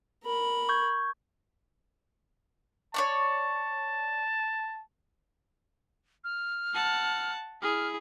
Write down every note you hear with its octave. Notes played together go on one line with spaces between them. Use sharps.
A#4 B5
C#6 G6 G#6
C#5 D5 A5 C#6
F6
F#5 A5
E4 G#4 F6